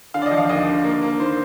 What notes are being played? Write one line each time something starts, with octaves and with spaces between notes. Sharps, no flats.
D3 F5
D5
D#5
F3
F5
D#2 D#5
D3
A#3
A#3
D#3 C5